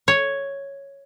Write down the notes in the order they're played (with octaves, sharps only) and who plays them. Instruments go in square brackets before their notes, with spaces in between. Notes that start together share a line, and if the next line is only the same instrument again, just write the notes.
[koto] C#5